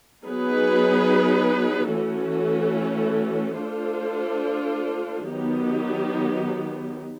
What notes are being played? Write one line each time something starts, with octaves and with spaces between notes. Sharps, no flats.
F#3 B3 D#4 G#4 B4
E3 A3 C#4 F#4 A4
A3 D4 F4 A4 C5
D#3 F#3 B3 D#4 G4